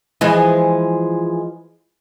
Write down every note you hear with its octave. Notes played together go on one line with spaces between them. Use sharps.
E3 F3 G#3